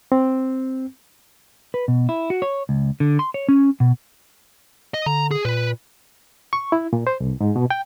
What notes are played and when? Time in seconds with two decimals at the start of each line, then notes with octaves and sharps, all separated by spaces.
0.12 C4
1.74 B4
1.88 B2
2.09 E4
2.30 F#4
2.42 C#5
2.69 C#2
3.00 D3
3.19 C6
3.34 C#5
3.49 C#4
3.80 B2
4.94 D#5
5.06 D3 A#5
5.31 G#4
5.45 A#2 B4
6.53 C#6
6.72 E4
6.93 A#2
7.07 C5
7.20 C2
7.41 G#2
7.56 B2
7.70 G5